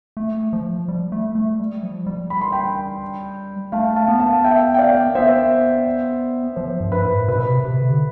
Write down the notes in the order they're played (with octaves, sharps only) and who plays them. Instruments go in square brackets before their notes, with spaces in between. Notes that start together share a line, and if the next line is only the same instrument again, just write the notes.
[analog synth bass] A3
F3
G3
A3
A3
G3
F3
G3
[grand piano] B5
C6
G5 B5
[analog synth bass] A3 [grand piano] F5 A5
[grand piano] F5 A5
[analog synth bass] B3
[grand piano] F5 A5
E5 G5
G5
D5 F5
[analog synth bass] B3 [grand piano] C5 E5
[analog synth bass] F3 [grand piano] C5
[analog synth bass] G2
[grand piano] B4
[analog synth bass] A2
[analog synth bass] B2 [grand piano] B4
[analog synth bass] C3
C3
D3